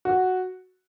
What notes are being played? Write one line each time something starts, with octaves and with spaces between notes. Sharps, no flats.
F#4